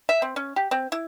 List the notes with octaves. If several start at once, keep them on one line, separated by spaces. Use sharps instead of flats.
E5
C4
C#4
G4
C4
E4